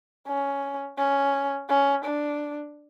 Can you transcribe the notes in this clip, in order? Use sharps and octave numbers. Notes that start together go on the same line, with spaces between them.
C#4
C#4
C#4
D4